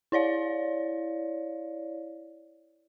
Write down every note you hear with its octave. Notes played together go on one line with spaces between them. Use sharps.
E4 C#5 D5 F5